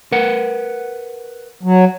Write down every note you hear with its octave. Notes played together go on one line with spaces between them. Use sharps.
A#4 B4 F#5
F#3